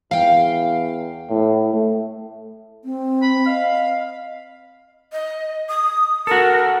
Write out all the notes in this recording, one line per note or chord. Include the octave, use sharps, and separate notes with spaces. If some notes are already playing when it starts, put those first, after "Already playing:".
E2 F5 G5
A2
A3
C4
B5
D#5 F5
D#5
D#6
F#4 A4 A#4